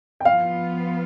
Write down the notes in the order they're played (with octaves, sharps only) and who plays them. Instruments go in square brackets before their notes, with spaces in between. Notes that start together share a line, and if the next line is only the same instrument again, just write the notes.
[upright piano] G5
[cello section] F3 B3 F4 [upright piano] F5